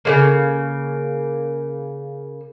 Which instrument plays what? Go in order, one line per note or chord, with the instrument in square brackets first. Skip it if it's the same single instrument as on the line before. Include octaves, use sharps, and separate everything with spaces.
[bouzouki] C#3 G#3 A#3